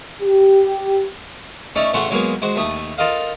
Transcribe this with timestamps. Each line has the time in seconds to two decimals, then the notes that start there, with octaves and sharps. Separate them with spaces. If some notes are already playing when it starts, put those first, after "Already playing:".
0.22 G4
1.76 A3 C#4 D#4 D5 E5
1.94 A1 C#3 A3 F#5 C6 C#6
2.10 F#3 G#3 A#3 B3
2.42 G#3 F#4 C5
2.56 D#2 A3 D#6
2.98 F4 A4 A#4 D#5 F5